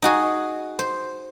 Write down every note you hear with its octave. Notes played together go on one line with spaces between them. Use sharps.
D#4 F#4 G#4
C5